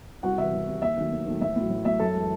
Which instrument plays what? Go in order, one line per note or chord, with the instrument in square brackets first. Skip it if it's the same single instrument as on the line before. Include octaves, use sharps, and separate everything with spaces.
[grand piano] C2 F#4 F#5
C3 E3 E5
C2
C3 E3
D#2 E5
D#3 F#3 A3
D#2
D#3 F#3 A3
A1 E5
A2 F#3
A1
A2 F#3 E5
F#2 A4 A5
E3 G#3